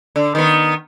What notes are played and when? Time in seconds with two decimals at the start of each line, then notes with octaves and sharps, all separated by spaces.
0.16 D3
0.35 D#3 B3